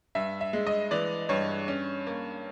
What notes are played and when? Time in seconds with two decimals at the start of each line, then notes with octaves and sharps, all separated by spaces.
0.15 G2 E5
0.41 E5
0.53 G#3
0.67 D#5
0.91 E3 D5
1.29 G2 C#5
1.68 C#4
2.07 A#3